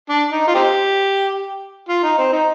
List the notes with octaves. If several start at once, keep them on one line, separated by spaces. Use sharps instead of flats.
D4
D#4
F4
C4 D#4 G4
F4
D#4
C4
D#4